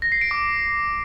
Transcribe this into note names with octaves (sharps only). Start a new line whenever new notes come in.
A#6
C7
D7
D6